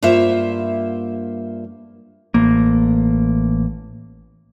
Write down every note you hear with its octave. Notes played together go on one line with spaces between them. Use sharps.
G2 A#3 F4 C5 E5
A1 A#3